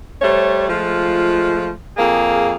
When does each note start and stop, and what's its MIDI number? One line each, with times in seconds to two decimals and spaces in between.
0.22 0.67 55
0.22 0.67 57
0.22 0.67 72
0.22 0.67 73
0.69 1.71 53
0.69 1.71 56
0.69 1.71 57
0.69 1.71 65
1.97 2.55 41
1.97 2.55 58
1.97 2.55 68